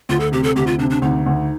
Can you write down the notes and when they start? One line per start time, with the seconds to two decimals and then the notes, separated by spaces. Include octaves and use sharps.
0.09 D2 F4
0.20 A4
0.32 C3 G4
0.43 A4
0.56 D2 G4
0.67 F4
0.78 C3 D4
0.90 D4
1.02 D2 D#4
1.26 D2